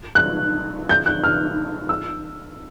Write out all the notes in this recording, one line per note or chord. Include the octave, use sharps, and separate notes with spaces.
F#6
G6
F#6
F6
E6